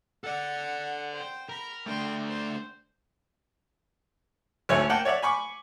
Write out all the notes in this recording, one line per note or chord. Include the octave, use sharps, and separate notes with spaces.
A4 D5 F#5
C5 G5
A#4 A#5 B5
A3 D4 G5 C6
C5
G#1 D2 A3 C#5
A#3 F#5 G5 A5
C#5 D5 E5 F#5
G#5 B5 C#6 D6